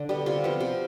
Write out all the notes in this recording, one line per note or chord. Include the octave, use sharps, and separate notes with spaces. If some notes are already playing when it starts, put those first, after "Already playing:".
Already playing: D3 A4 D5
G3 B3
C3 F4
F3 B3
C3